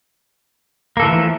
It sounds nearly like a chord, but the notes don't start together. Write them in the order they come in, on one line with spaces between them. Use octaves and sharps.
A#3 A4 E3 A3 F3